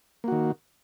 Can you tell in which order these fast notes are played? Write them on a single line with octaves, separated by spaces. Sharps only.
A#3 F#4 D#3